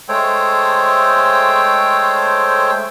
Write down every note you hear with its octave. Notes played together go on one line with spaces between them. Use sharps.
G#3 A3 A4 C5 C#5 G5